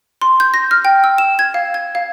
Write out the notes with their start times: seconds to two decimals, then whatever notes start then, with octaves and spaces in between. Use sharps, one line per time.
0.22 C6
0.40 G6
0.54 A#6
0.71 F6
0.85 G5
1.04 E6
1.18 E7
1.39 G#6
1.54 F5
1.74 G#6
1.95 F5